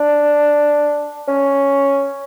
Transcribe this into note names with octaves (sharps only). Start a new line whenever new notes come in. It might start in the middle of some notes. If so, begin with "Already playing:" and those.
Already playing: D4
C#4